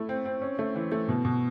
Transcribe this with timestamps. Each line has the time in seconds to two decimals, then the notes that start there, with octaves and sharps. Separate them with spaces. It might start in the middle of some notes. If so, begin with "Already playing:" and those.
Already playing: A3 E4
0.09 C4
0.25 C4
0.42 C#4
0.59 A3
0.75 E3
0.92 A3
1.08 B2
1.25 B2